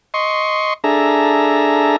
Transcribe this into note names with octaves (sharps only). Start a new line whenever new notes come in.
D#5 C6 C#6
D4 G#4 A4 E5 A#5